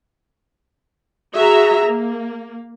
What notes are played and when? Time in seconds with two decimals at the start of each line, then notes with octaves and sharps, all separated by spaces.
1.35 F#4 G#4 E5 A#5
1.87 A#3